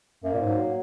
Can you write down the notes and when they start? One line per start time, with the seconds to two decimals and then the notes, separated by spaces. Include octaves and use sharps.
0.24 F#2 A#3
0.34 A#2
0.42 G#2 F#3